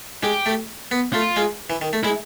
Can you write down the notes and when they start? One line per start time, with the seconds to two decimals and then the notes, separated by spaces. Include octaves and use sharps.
0.23 G#3 G4
0.46 A3
0.91 B3
1.13 A3 F4
1.36 G#3
1.70 E3
1.81 D#3
1.93 A3
2.03 G#3 E4